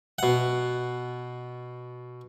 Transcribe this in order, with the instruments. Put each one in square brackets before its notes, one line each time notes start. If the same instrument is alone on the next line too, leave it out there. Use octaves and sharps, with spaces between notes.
[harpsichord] B2 F#5